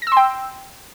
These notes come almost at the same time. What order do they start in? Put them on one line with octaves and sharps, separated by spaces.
A#6 E6 C6 G5